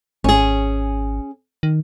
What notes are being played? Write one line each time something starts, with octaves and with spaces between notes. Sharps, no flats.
G#1 C#4 G#4
D#3